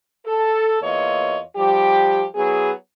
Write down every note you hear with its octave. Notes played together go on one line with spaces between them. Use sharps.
A4
E2 A#3 F4 C#5 D#5
F3 G3 G4
F#3 B3 E4 G#4